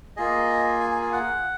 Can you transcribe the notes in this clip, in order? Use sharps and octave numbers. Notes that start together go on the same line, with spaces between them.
A#3 F4 G#4 D#5
G#5
G#5
F5
F#5